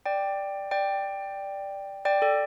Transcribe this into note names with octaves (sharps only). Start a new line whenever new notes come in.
D5 G5
D5 G5
D5 G5
A4 D5